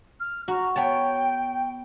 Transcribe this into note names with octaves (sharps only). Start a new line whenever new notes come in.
F6
F#4 A#5
B3 C#5 G5 A5